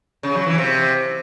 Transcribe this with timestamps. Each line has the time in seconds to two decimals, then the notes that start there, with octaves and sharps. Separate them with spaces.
0.23 C#3
0.35 F#3
0.46 E3
0.58 C3